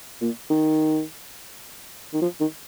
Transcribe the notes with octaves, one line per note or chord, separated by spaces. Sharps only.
A#2
D#3
D#3
F3
D#3